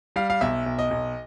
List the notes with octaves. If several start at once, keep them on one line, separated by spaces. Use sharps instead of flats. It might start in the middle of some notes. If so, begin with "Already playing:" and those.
G3 F5
F5
B1 E5
B1
D#5
B1